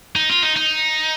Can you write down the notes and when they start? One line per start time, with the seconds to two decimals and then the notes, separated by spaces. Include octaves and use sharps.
0.16 D#4
0.29 F4
0.43 D#4
0.56 D#4